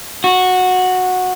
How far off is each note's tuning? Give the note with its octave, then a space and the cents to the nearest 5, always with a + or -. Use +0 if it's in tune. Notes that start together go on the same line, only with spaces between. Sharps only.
F#4 -10